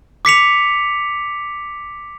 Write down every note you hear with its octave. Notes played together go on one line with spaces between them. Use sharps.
D6 B6 C#7 F7